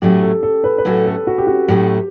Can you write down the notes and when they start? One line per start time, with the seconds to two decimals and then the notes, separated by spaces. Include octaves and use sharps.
0.02 A2 F#3 A3 C#4 F#4 G4
0.23 A4
0.43 A4
0.64 B4
0.78 B4
0.85 A2 F#3 A3 C#4 F#4 A4
1.06 A4
1.27 F#4
1.38 G4
1.47 F#4
1.68 A2 F#3 A3 C#4 F#4 G4